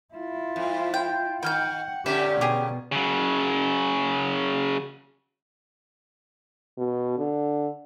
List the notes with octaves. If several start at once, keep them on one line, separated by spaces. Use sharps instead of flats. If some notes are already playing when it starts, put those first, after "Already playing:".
E4 F4
F2
G5
D#3 F#5 G5 F6 G6
A#2 D3 C#4 G4 E5
B2 G4 G#4
C#3 F#3
B2
D3